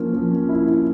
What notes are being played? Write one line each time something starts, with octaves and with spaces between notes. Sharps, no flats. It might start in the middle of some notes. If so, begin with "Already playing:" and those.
Already playing: F3 A#3 C#4
F3
C#4
E4
E4